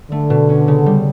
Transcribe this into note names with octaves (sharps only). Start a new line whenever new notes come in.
D3 A3
B2
C#4
C#3
G3